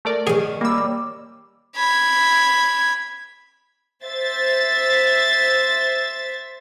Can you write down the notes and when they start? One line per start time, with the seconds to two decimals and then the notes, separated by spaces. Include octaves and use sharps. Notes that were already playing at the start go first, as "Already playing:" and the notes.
0.05 A3 A#4 D5
0.27 D#3 C#4 G#4
0.61 G3 A#3 D5 E6
1.76 B5 G#6
4.04 C5 E5 A6